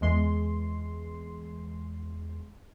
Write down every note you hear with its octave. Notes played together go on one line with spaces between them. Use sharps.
E2 G#3 C6